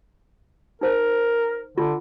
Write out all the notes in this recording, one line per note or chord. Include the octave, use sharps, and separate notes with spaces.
D#4 A#4 C5
D3 F4